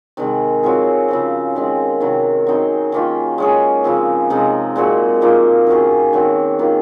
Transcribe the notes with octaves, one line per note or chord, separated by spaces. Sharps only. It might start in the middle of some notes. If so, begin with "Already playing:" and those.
C3 D#3 G#3
F#3 C4 F4 G#4
C#3 F3 C4
D#3 G#3 C4
C3 D#3 F#3
F#3 C4 D#4 G#4
D#3 A#3 C#4 F4
G#3 C#4 G#4
C#3 F3 C4
C3 F3 G#3 D#4
A#2 G#3 C4 F#4
A#2 F3 A#3 D#4
D#3 F#3 C#4 G#4
D#3 F#3 C4
D#3 A#3 F4 G#4